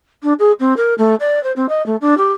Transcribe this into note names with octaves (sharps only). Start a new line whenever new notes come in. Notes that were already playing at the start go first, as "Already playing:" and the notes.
D4
G#4
C4
A#4
A3
D5
C5
C4
D#5
A3
D4
G4